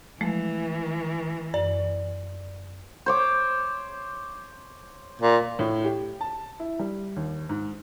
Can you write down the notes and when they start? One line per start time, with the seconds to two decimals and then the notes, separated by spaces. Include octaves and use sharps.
0.21 E3 F3 G#3 A3
1.54 F#2 D5
3.06 C5 C#5 D6
5.21 A#2
5.59 A2
5.85 G4
6.21 A5
6.60 E4
6.79 G3
7.16 D#2
7.49 G#2